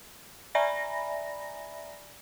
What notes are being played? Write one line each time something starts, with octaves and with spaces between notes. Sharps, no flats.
D5 E5 G#5 A#5 B5 A#6